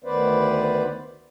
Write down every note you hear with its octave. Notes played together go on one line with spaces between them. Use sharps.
D2 D#3 B3 B4 C5 D5